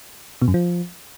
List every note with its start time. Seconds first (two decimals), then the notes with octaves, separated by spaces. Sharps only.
0.42 B2
0.48 F#2
0.54 F3